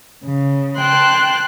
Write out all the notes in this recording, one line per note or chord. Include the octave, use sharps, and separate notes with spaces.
C#3
G5 A5 C6 F#6